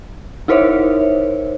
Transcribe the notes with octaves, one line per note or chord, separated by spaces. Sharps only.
D#4 E4 A#4 C5 C#5 E5